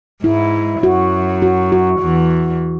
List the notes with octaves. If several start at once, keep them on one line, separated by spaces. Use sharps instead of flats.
G#2 G#3 E4
F#2 F#3 F#4
F#4
F#4
E2 E3